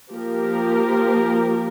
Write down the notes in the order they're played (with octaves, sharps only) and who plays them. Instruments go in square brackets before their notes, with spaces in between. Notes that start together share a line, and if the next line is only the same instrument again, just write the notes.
[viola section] F3 A#3 G4 A#4